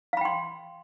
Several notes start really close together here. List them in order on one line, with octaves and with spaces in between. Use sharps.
F5 B5 G5 C6